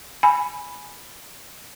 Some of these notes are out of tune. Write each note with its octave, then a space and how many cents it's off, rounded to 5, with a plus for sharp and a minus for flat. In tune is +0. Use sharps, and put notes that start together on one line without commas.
G#5 +0 B5 +0